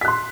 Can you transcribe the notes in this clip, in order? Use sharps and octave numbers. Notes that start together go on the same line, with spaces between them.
C6 F#6 B6